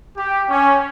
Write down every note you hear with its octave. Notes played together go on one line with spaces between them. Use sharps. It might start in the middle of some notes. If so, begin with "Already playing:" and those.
G4
C#4